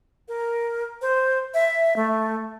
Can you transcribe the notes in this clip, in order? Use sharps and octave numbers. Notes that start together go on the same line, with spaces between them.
A#4
C5
E5
A3